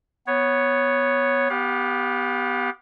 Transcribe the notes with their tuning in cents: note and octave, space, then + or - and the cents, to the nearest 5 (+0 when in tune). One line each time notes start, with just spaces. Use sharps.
B3 +0 C#5 +0
B3 +0 G4 +0 F5 +40